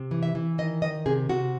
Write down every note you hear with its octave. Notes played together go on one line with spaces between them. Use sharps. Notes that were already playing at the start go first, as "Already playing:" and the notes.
Already playing: C3
E3
E5
E3
D#3 D#5
D#3 D#5
C3 G#4
C3 F#4